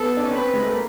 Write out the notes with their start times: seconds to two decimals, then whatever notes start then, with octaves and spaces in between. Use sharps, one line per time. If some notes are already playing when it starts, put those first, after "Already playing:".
Already playing: B3 A4
0.17 D4
0.24 C#4
0.32 C4 B4
0.54 G#3
0.63 A3
0.72 A#3